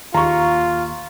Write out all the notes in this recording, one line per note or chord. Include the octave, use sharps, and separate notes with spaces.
D#2 F4 A#5 C#6